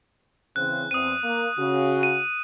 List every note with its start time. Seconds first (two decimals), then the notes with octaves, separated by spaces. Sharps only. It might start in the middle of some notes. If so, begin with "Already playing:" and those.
0.56 C#3 E3 C4 F#6
0.91 E2 C4 D#6 D#7
1.23 A#3
1.57 C#3 F#4
2.03 D#7